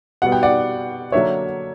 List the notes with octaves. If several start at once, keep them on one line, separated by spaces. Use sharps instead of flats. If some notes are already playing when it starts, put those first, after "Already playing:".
B2 G3 B3 F#5
G5
D5 F#5
D3 F#3 A#3 D4 C#5 E5